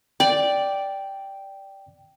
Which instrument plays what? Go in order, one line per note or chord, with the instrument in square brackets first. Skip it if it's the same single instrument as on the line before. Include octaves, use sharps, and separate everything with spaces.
[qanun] D5 [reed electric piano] G5